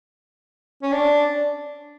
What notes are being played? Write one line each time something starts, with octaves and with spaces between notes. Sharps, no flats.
C#4
D4